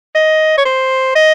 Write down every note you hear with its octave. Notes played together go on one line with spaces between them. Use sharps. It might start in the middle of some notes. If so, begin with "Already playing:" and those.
D#5
C#5
C5
D#5